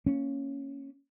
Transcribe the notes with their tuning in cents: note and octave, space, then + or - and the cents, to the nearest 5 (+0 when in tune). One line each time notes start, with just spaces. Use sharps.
A#3 -5 C#4 +0